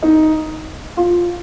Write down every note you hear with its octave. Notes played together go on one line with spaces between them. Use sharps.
D#4
F4